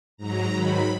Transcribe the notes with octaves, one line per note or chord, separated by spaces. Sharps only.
G#2 F#3 A#5
G#2 D#3 F#3 B5